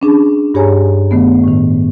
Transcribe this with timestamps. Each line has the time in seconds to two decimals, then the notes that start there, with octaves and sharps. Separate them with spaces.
0.02 C#4 D4 G#4
0.54 G2 G4 G#4 C#5 G#5 A#5
1.11 D#3 A3 B3
1.44 A2 D#3